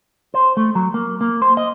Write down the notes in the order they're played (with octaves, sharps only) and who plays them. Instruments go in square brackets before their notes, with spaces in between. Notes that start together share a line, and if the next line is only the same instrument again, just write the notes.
[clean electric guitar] C5
A3
F#3
A#3
A#3
C5
D#5